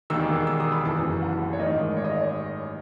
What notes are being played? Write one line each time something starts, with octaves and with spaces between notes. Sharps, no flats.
E1 D#2 D#3 E6
E6
D#6
B5
F#1 F#2 E3 A5
F#5
C#5
A1 G#2 D#3 D#5
C#5
D#5
C#5